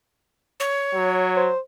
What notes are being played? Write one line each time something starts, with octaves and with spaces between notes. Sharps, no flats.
C#5
F#3
C5